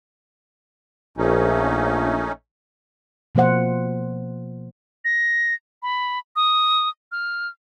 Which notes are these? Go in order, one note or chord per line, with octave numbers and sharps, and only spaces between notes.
A#1 A3 C#4 D#4
B2 F3 A#3 C5 F#5
A#6
B5
D#6
F6